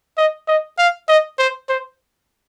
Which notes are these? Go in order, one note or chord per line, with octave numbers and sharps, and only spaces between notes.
D#5
D#5
F5
D#5
C5
C5